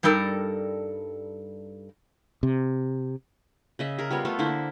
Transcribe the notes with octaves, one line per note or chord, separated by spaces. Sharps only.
G2 G3 D#4 A4 A#4
C3
C#3 D#5 E5
G#4 A#4
G3 B3 F4 C#5
A3 B3 F4 A4
D3 A#3 E4 C5